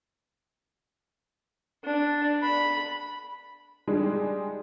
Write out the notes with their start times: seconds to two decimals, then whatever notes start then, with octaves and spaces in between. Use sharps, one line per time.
1.84 D4
2.43 B5
3.87 G3 G#3 D4 D#4 G#4